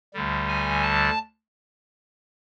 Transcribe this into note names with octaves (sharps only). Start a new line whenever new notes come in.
D2 D3 G3
G#5
A5